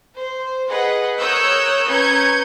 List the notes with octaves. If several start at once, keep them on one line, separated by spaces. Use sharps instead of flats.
C5
G#4 B4 D#5 F#5
A#4 C#5 D#6 E6 F#6 G6
C#4 B4 A#5 G6 G#6 C#7